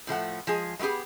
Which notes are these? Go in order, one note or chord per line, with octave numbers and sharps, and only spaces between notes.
A2 F3 A3 F#5
F3 G#3 G#4
G#3 A3 B3 G4 G#4